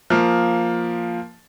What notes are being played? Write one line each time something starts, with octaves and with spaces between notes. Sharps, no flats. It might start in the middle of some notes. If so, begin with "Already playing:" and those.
F3 A#3